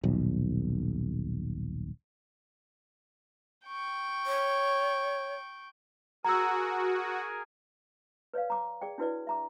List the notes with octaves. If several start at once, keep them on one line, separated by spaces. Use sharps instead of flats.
D#1 B1
G5 C#6
C#5
F#4 G#4 A#4 G#5 A#5 E6
B4 C#5 D5 F5
A#5 D6
G#4 D5 G5
D4 E4 F#4 B4 C#5 D5
E5 A#5 D6